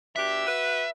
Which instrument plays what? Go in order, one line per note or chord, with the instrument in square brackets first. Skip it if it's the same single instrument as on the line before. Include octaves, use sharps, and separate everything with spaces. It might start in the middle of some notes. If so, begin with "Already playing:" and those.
[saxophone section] B2 D4 G4 [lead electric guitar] E5
[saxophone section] F#4 B4